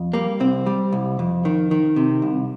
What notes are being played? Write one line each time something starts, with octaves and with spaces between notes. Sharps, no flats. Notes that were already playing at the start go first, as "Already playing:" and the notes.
Already playing: F2
G3 A#3
C2 C4
G3
C2
F2
D#3
D#3
C3
C2